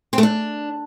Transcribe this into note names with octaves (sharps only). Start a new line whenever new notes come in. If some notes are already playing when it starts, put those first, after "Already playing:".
C4
A3
D4